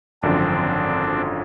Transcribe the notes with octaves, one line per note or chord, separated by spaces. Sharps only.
G#1 F#2 D3 F3 C4 D4